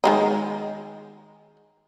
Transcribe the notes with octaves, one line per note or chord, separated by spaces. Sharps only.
D#3 G#3 D#4